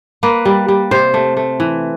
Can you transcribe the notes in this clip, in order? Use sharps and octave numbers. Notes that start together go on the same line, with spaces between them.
A#3 B4
G3
G3
C3 C5
A3
A3
E3